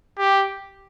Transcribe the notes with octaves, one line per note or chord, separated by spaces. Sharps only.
G4